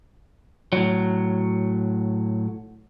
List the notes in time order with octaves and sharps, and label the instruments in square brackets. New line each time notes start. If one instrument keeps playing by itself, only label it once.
[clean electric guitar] A2 F#3